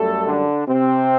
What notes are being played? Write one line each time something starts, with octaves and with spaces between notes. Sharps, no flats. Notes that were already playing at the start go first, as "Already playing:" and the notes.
Already playing: F#2 G3 A3 A4
D3 D4
C3 C4